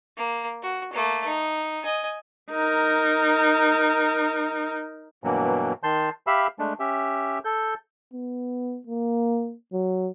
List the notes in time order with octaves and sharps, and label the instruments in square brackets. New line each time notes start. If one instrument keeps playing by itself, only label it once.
[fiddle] A#3
F#4
A3 A#3
D#4
D#5 G#5
[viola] D#4 A#4
[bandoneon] G2 B2 E3 F#3 A#3
D#3 A5 C6 G6
G4 E5 F5 B5 E6
G#3 A3 D4
C#4 G4 E5
A4 G6
[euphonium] B3
A#3
F#3